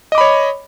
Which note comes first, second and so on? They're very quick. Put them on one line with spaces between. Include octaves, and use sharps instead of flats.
D#5 D6 B5 C#5